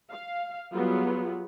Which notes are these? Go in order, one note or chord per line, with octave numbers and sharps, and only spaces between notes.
F5
F#3 G3 B3 F4 G#4